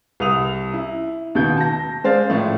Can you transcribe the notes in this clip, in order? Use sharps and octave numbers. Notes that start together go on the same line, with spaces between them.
C2 D#6 F7
E4
D#2 B2 G6
A5 A#6
G#3 C5 D5 F5 A6
A2 F3 A3